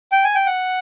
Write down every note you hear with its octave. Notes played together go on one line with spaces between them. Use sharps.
G5
G#5
G5
F#5